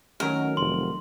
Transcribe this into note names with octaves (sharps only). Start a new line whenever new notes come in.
D#3 F#3 A3 C#4 A#4
F1 C6